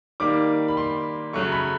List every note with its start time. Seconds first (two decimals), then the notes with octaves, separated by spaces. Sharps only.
0.20 D#3 G3 A#3 D6
0.68 B5
0.77 C6
1.33 C#3 F#3 A3 C#6
1.52 B5